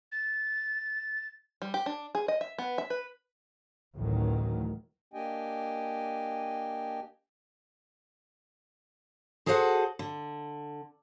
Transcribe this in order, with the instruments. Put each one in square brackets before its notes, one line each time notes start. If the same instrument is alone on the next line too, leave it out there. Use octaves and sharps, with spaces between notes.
[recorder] A6
[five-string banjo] G3
G4
D4
G#4
D#5
E5
B3
E5
B4
[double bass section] A1 D2 D#3 F#3
[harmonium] A#3 D4 G4 D#5 G5 G#5
[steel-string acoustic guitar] F#4 G#4 A4 C5 E5 F#5
D3